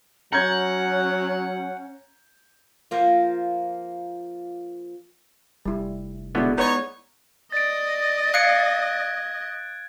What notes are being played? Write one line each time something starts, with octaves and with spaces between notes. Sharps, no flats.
F#3 C#4 F#5 A#5 G6 G#6
F3 A#3 F4
F1 G3 E4
B2 D3 G#3 B3 E4 D5
B3 D#4 B4 C#5 D5
D5 D#5 A6 D7
F5 F#6 G#6 C#7 D7